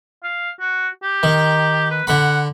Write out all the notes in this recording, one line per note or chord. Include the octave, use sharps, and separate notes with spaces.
F5
F#4
G4
D#3
B4
D3 F#5 B5